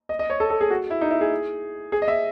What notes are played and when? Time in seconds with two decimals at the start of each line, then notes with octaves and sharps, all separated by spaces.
0.09 D#5
0.19 D#5
0.30 C#5
0.40 A4
0.50 A4
0.61 G#4
0.70 F#4
0.90 E4
1.01 D#4
1.11 E4
1.21 G#4
1.92 G#4
2.02 D#5
2.08 E5